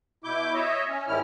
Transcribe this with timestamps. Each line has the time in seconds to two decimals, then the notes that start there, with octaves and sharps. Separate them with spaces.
0.24 B2 E4 D6 G6
0.54 C#5 D#5 E5
0.89 C#4
1.08 G#2 D#3 G3 C#4 E4 F6